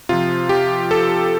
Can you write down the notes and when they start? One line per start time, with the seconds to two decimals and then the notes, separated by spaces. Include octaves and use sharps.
0.09 C3 F3 F4
0.49 G4
0.91 A4